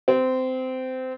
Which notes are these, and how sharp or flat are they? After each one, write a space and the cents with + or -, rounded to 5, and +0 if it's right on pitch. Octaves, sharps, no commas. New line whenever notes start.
C4 -20